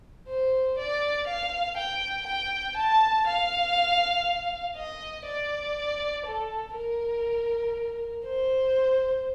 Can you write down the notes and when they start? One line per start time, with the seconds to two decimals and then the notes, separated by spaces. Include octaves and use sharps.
0.28 C5
0.78 D5
1.27 F5
1.77 G5
2.27 G5
2.77 A5
3.27 F5
4.76 D#5
5.27 D5
6.26 A4
6.76 A#4
8.25 C5